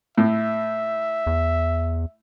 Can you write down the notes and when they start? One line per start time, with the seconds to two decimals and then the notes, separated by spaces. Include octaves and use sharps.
0.18 A2 E5
1.27 E2